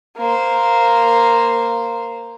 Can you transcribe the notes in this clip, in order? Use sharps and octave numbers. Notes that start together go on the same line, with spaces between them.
A#3 C5